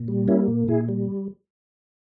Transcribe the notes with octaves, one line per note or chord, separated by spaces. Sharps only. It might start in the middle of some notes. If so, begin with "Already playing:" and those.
Already playing: A#2
G3
A#3 C#4 E4
A#2
A#2 E4 G#4
G3